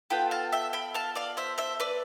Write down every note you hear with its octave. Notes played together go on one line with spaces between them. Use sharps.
B3 F4 A4 G5 B5
F5 A5
E5 G5
G5 B5
F5 A5
D5 F5
C5 E5
C5 E5
B4 D5